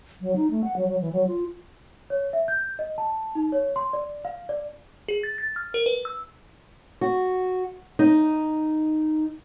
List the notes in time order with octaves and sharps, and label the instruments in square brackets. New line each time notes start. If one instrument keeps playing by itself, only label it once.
[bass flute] F#3
D#4
A3
F#5
F#3
F#3
E3
F#3
F4
[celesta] C#5
E5
G6
D#5
A5
D#4
C#5
C6
D5
F5
D5
[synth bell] G#4
A6
A6
F6
A#4
B4
E6
[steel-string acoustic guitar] F#4
D#4